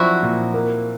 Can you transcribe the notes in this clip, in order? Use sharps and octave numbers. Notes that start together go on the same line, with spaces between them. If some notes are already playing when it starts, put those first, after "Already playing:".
Already playing: F3 F#3 C4 D4 E4 F#4
A#2
A#3